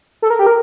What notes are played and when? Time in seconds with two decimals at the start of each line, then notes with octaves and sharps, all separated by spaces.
0.22 A4
0.30 A#4
0.39 G4
0.47 A#4